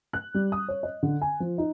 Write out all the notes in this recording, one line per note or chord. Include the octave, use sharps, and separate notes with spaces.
F#6
G3
D#6
C#5
D#5
D3
G#5
F3
D#4